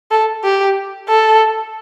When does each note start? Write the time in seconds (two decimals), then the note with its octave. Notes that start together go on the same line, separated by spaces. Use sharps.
0.11 A4
0.44 G4
1.08 A4